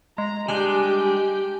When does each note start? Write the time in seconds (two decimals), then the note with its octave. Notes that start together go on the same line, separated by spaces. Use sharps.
0.18 G#3 A#5
0.49 G3 G#3 D4 G4 G5 G#5